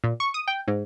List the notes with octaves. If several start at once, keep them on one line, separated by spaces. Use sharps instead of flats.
A#2
C#6
D#6
G5
G#2